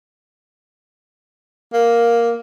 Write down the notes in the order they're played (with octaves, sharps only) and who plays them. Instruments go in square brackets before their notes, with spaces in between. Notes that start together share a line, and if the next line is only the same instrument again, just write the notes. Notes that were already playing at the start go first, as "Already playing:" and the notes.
[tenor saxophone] A#3